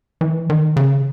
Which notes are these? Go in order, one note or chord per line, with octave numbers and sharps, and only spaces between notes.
E3
D#3
C#3